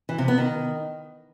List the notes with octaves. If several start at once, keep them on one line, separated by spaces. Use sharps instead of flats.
E3
C3
B3
D#3